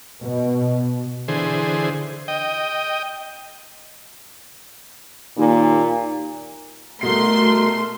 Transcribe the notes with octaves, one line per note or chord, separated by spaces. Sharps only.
B2
D3 E3 G#4 C5
D#5 G5
D#2 A#2
C2 B2 A3 A#4 C6 C7